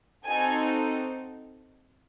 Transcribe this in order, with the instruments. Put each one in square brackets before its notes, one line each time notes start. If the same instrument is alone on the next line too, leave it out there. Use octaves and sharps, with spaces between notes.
[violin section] C4 D#4 F#4 A4 G#5